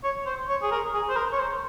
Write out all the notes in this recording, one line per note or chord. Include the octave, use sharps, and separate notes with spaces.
C#5
C5
C#5
G#4
A#4
G#4
C5
A#4
C#5
C5